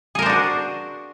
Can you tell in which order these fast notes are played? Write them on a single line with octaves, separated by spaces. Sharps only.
G#4 A#4 C5 D4 F#4